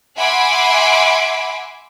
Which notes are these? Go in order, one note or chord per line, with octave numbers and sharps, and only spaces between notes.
E5 F#5 G#5 B5 C6 D6